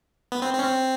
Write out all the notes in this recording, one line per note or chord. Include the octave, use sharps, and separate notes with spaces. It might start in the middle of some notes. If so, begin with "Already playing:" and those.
B3
C4
C4
C#4
C4